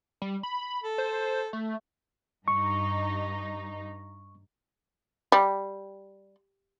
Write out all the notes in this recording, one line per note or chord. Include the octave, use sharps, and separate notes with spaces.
G3
B5
A4
C5
A3
G2 D#4 C#6
G3